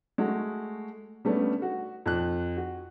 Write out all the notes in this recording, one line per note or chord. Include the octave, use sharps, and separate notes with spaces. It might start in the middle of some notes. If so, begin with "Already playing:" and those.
G#3 A3 F#4
G3 A3 B3 C#4 D4
F#4
F2 F#6
F#4